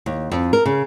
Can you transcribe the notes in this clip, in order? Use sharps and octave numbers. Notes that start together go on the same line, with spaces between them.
D#2
F2
A#4
C#3